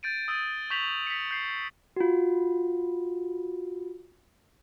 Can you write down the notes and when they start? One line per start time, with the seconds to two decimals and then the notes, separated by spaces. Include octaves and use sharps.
0.03 G6 A6 D7 D#7
0.28 D#6 E6 A6 D#7
0.70 C#6 G6 B6 F7 F#7
1.07 B6 C#7
1.31 G6 C7
1.96 F4 F#4